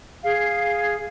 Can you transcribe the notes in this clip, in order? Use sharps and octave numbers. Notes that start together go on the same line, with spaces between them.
G#4 F5